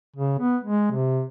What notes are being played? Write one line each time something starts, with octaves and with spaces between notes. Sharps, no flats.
C#3
B3
G#3
C3